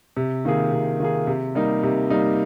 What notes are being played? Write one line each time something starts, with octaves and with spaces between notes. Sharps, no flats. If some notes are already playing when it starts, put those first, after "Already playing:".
C3
D#3 A#3 F4 G#4
C3
D#3 A#3 F4 G#4
C3
G3 A#3 D#4
C3
G3 A#3 D#4